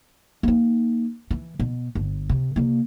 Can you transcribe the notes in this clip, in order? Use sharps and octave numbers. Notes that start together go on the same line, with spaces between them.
A#3 D#4
E3
B2
G1
C3
C3 A#3